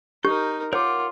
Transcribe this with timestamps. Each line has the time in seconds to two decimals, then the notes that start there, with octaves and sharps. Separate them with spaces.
0.25 D#4 G4 A#4 G6
0.73 F4 A#4 C#5 F#5 D6